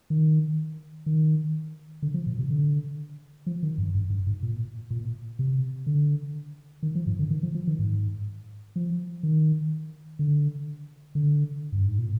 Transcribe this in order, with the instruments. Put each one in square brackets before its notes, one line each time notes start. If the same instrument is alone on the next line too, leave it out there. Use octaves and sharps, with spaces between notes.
[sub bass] D#3
D#3
D3
F3
A#2
C3
D3
F3
D#3
G2
G2
G2
G#2
A#2
A#2
C3
D3
D#3
F3
G#2
D3
D#3
F3
F3
D#3
G#2
F3
D#3
D3
D3
G2
G#2
A#2